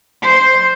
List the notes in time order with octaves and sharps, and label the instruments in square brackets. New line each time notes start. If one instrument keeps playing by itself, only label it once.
[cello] C5